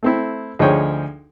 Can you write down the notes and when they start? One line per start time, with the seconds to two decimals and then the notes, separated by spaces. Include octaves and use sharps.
0.03 A3 C4 E4
0.59 D2 F3 D#4 G#4 C#5 G5